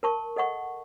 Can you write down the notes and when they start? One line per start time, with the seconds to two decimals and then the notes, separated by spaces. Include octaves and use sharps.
0.03 A#4 A5 C#6
0.36 A4 D#5 F#5 C#6